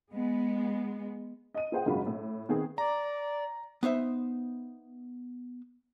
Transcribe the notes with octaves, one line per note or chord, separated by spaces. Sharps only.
G#3 B3
D#5 D#7
F4 G#4 C5 F#5 G5
F#1 G#2 C#3 F4 F#4 B5
A2
D#3 B3 C4 G#4
D5 A#5
B3 D#4 C5 E5